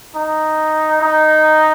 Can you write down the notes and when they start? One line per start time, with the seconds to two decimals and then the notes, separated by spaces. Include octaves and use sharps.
0.15 D#4
1.01 D#4